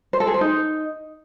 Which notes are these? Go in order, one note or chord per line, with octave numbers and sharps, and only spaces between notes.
C5
A4
G#4
C5
D#4